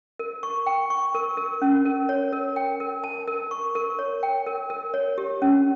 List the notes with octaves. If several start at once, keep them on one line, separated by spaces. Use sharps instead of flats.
A#4
C#6
G5
C#6
A#4
A#4
C#4
A#4
C#5
A#4
G5
A#4
A5
A#4
C#6
A#4
C#5
G5
A#4
A#4
C#5
G4
C#4